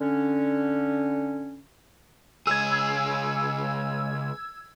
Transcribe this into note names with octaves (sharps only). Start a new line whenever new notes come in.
D3 C#4
C#2 G#4 E6 G#6